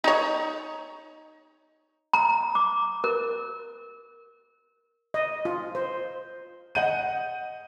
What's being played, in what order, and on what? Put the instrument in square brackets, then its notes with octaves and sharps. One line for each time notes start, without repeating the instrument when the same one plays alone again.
[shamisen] D#4 C#5
[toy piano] A#5
D6
A#4
[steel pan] D#5
F4
C5
[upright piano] D#5 F#5 G6 D#7